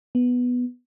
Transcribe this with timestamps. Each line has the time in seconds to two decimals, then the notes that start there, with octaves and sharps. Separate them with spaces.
0.15 B3